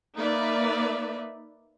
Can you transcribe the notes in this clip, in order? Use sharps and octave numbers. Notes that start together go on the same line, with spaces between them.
A#3 D#4 B4 D5 E5